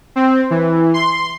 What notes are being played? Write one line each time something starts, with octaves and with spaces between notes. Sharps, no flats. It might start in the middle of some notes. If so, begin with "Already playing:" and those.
C4
E3
C6